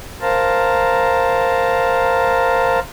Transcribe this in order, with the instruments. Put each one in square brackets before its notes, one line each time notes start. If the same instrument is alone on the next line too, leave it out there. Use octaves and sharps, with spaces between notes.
[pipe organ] A#4 C5 F5 A5 A#5